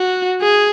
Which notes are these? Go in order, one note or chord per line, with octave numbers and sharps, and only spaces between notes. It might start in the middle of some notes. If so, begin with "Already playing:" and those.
Already playing: F#4
G#4